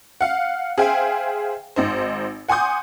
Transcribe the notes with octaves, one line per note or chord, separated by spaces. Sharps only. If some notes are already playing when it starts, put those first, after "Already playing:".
F5 F#5
G#4 C5 E5 F5 G5 G#5
G#1 D#4 C5
F#5 G#5 C6 D6 D#6 G6